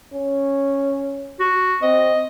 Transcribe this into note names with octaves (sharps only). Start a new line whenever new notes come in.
C#4
F#4
C4 D#5